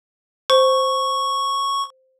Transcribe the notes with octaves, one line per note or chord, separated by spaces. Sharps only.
C5 C#6